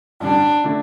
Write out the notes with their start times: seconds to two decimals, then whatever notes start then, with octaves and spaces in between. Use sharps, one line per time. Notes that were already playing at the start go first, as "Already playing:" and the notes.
0.20 A1 G2 D3 G3 D4
0.64 D3 A3 D4